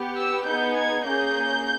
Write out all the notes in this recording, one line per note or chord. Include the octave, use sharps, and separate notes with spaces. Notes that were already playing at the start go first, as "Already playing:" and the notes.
Already playing: B3 G4
E6
B3 D#4 G#4 G6
G#6
A#3 C#4 G#4 G6